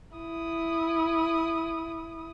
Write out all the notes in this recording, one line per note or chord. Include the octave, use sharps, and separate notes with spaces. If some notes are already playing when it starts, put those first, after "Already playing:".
E4 D#6